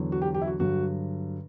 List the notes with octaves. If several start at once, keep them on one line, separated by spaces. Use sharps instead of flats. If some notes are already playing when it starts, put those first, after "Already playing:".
Already playing: E2 D3 F#3
F#4
G4
G4
E4
F#4
G2 D3 F#3 F#4